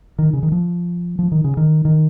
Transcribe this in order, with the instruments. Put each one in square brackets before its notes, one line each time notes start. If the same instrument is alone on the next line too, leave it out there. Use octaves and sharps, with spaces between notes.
[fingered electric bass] D#3
C#3
D#3
F3
F3
D#3
C#3
D#3
D#3